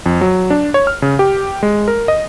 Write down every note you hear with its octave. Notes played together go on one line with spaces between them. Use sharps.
F2
F#3
D4
C#5
F6
C#3
G4
G#3
A#4
D#5